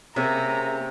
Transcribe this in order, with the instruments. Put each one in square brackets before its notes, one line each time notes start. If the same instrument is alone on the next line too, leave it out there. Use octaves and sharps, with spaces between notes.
[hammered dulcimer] C3 [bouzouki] A#3 C#4 G#4 [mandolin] E5 [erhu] A#5